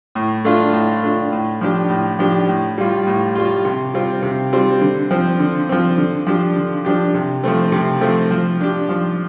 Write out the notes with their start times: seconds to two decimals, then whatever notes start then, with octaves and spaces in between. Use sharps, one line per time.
0.15 A2
0.45 A3 D4 F4
0.73 A2
1.03 A3 D4 F4
1.32 A2
1.61 F3 D4 G4
1.90 A2
2.19 F3 D4 G4
2.48 A2
2.78 G3 F4
3.07 A2
3.35 G3 F4
3.65 C3
3.94 G3 C4 F4
4.23 C3
4.52 G3 C4 F4
4.81 D3
5.11 F3 C4
5.39 D3
5.69 F3 C4
5.98 D3
6.27 F3 D4 G4
6.56 D3
6.85 F3 D4 G4
7.14 C3
7.44 F3 A3 C4
7.72 C3
8.01 F3 A3 C4
8.31 F3
8.61 D4 G4
8.89 F3